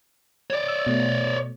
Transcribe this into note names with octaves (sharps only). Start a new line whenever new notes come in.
C#5 D5
E6
B2 A3